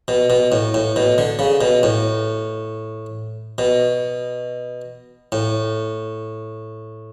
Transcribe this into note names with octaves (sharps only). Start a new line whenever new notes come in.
B2
B2
A2
A2
B2
D3
C#3
B2
A2
B2
A2